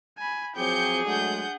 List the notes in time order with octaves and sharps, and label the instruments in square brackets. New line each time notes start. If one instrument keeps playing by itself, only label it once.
[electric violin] G#5 B5
[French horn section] F3 F#3 C4 [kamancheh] G#4 [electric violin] G5 D6 [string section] G6 C#7
[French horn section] F#3 G#3 A3 [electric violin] D4 [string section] F#5 G6